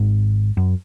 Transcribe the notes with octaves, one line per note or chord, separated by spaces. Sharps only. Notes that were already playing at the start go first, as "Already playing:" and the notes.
Already playing: G#1 G#2
F#2